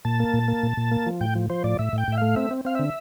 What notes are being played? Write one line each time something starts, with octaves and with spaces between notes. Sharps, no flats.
A#2 A5
A#3
A#2
A#3
A#2
A#2
A#3
F3
A2 G5
F3
F3 C5
A2 D5
A2 E5
A2
G5
A2 E5
A3 F5
C4 E5
C4
C4 F5
D3 E5